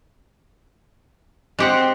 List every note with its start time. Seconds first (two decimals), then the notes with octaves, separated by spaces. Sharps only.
1.59 G#3 C4 G4 F#5